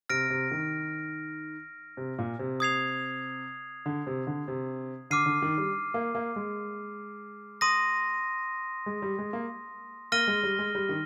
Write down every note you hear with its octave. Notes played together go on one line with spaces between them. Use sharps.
C3 F6 A#6 D7
C3
D#3
C3
A#2
C3
D#6 G#6 C7 F7
D3
C3
D3
C3
D3 D6 F6 C7 D#7
D3
D#3
G3
A#3
A#3
G#3
C6 D#6 A#6 D#7
G#3
G3
G#3
A#3
A#3 F6 A#6 D#7 G7
G#3
G3
G#3
G3
D#3